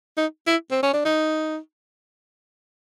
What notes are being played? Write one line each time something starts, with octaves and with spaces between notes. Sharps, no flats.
D#4
E4
C4
C#4
D4
D#4